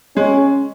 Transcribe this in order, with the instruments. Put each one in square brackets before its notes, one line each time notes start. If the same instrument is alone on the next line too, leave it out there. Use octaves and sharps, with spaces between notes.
[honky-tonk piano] G#3 [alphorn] C#4